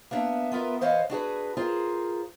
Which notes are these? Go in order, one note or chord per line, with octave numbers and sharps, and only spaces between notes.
A#3 B3 D4 E5
B3 F4 A#4 B4 E5
E3 C5 C#5 D#5 F5 F#5
D4 F#4 G#4 B4
F4 G#4 A#4 C5